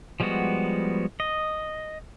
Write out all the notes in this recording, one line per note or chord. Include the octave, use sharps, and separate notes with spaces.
F3 G3 G#3 B3 F#4
D#5